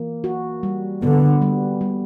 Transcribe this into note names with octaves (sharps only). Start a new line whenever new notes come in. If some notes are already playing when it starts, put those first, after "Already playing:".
Already playing: E3 A#3
F#4
G3
D3 B3
G3
G3